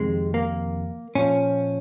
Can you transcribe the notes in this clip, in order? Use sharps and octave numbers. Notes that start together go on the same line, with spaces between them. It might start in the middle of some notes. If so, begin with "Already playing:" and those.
Already playing: F2 C3 D#3 G#3
A#3
A#2 F3 C#4